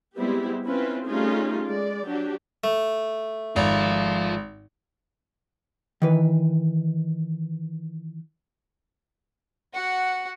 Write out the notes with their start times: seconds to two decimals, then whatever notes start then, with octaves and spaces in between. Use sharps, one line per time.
0.16 G3 G#3 B3 C4 E4 G4
0.65 C4 C#4 E4 F4 B4
1.04 G3 A3 C#4 D#4 F4 G#4
1.64 G#3 D5
2.06 F#3 D4 F#4 G4
2.64 A3
3.56 G#1 F3 F4
6.02 D#3 E3 B4
9.74 F#4 F#5